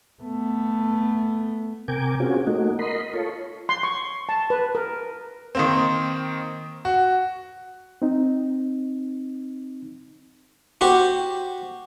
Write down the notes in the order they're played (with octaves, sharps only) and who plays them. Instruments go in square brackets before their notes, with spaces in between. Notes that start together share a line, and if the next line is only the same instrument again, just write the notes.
[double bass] A3 B3
[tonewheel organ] C3 A#4 G5 G#5 D6
C4 C#4 F4 F#4 G#4
A3 A#3 D#4 F#4
A#4 D#5 B5 C6
F4 A4 C#5
[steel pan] C6
C#6
A5
B4
A#4
[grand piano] D#3 A#3 C4
F#4
[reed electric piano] C4 D#4
[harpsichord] F#4 G4 C5